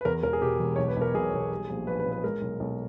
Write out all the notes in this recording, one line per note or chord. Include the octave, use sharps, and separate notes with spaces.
B4
E2 A#4
E1 A#4
G#4
B2 G4
E1
B1 C#5
B4
B1 A#4
B1 G#4
B1
G3
A#1
A#1 B4
B4
A#2
B4
G#3 A#4
B1
B1